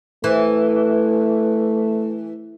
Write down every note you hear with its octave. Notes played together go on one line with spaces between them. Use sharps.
E3 A3